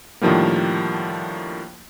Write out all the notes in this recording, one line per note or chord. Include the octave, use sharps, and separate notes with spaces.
A2 D3 D#3 F3 G3 A#3